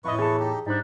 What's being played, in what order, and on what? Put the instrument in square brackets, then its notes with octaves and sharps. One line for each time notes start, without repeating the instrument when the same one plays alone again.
[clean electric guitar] F2 D#5 [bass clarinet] A2 [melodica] E4 B4 C#6
[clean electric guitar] E2 A4 [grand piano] G#4
[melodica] D#4 G4 D#5
[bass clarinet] G#2 [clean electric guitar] G3 D4 [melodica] D#4